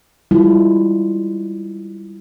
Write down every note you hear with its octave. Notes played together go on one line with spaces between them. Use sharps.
G3 G#3 E4 F4